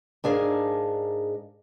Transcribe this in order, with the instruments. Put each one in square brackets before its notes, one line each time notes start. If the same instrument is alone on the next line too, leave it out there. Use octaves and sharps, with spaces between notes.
[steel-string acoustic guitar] G#2 D4 G#4 A#4 F5